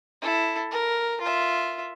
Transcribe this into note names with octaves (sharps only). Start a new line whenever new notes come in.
E4 A4
A#4
F4 E5